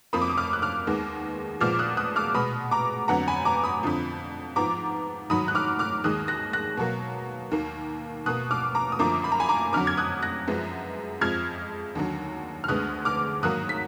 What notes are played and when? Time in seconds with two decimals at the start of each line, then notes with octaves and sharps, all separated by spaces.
0.13 F2 F3 A#3 B5 D#6
0.22 D6
0.30 D#6
0.37 D6 F6
0.53 F#6
0.62 D6 F6
0.87 D#2 D#3 G#3 B3
1.60 A#2 F3 G#3 B3 D6 F6
1.79 D#6 F#6
1.97 D#6 F#6
2.16 D6 F6
2.34 B2 G#3 B3 B5 D#6
2.71 A#5 D6
3.08 F2 D3 F#3 B3 F#5 A#5
3.28 G#5 B5
3.45 A#5 D6
3.64 B5 D#6
3.83 F2 D3 F3
4.56 G#2 F3 B3 A#5 D6
5.30 G#2 D#3 F#3 B5 D#6
5.48 F#6
5.55 D6 F6
5.79 D6 F6
6.04 D#2 D#3 G#3 D#6 F#6
6.28 F#6 A#6
6.53 F#6 A#6
6.77 B2 F#3 A#3
7.51 D#2 D#3 A#3
8.26 B2 A#3 D#6 F#6
8.51 D6 F6
8.75 A#5 D6
8.92 D#6
8.99 F#2 D3 F3 A#3 A#5 D6
9.24 B5
9.32 A#5
9.40 G#5 B5
9.49 A#5 D6
9.73 F2 D3 F#3 D6 F6
9.87 G#6
9.97 D#6 F#6
10.22 F#6 A#6
10.48 F#2 F3 G#3 B3
11.21 F2 F3 G#3 F6 G#6
11.95 D#2 D3 F#3
12.64 F6
12.68 D2 D3 G#3 B3 D#6 F#6
13.05 D6 F6
13.43 G#2 D#3 F#3 A#3 D#6 F#6
13.69 B6